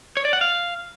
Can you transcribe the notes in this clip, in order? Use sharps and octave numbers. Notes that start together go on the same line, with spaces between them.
C#5
D5
F#5
F5